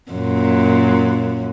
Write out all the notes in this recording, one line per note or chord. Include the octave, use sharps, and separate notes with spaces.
F#2 A#2